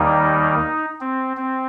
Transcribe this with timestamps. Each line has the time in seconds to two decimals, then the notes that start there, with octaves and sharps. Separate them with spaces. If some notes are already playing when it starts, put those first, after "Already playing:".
Already playing: D#2 D#3 G3 A#3 D#4
1.01 C4
1.37 C4